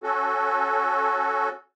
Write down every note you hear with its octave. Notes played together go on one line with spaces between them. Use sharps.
C#4 F#4 A4